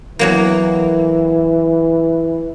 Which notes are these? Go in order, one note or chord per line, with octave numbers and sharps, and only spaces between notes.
E2 E3 F#3 A#3